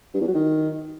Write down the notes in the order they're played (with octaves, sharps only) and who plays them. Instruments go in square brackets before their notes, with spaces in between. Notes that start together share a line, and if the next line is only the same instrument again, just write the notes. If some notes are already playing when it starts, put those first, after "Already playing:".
[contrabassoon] G2
E2
F#3
D#3